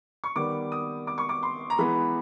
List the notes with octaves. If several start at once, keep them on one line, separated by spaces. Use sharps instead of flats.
C#6
D#3 G3 B3 D6
D#6
D6
C#6
D6
C6
A#5
E3 G#3 B3 B5